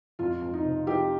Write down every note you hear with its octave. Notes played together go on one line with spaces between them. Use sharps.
F2 F4
F2
D#4
C3
F3 G4